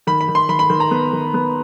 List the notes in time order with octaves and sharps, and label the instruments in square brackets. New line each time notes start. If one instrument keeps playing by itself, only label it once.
[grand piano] D#3 B5
B5
D#3
C6
D#3 B5
B5
D#3
A#5
B3
D#3
B3